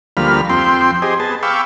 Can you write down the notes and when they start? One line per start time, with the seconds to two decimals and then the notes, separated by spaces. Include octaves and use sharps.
0.17 D2 F3 G3 A#3 B5 F6
0.49 F2 C4 G5 C6
1.02 G4 G#4 C5 D#5
1.20 B3 G#4 A5
1.43 F5 G5 B5 C#6 D6 E6